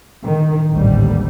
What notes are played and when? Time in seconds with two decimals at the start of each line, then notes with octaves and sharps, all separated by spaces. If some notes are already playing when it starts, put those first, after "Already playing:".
0.23 D#3
0.72 A1 D#2 G#2 D3 G3